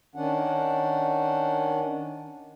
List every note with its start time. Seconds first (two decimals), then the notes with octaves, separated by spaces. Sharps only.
0.16 D#3 C#4 D4 F#5